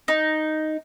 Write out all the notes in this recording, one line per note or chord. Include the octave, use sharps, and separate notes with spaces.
D#4